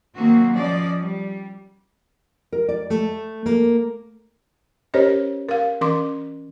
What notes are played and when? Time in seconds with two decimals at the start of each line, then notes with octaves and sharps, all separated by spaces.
0.15 D#3 F#3 A#3 C4 F#4
0.55 F3 C#4 D5 D#5
1.01 G3
2.52 A#4
2.68 D5
2.90 A3
3.46 A#3
4.94 C#4 G4 A#4 C5 C#5 D#5
5.49 A#4 F5
5.81 E3 C#4 A#4 C6 D6